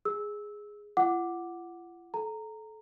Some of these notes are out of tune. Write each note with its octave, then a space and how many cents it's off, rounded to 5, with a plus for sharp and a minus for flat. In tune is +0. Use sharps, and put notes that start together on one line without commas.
G#4 +0 E6 -15
F4 -45 F#5 +0 D6 +0
A4 -25 A#5 -15